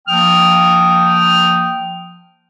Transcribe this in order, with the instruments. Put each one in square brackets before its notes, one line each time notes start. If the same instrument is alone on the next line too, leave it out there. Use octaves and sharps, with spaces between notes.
[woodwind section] F3 A#3 G5 D#6 F6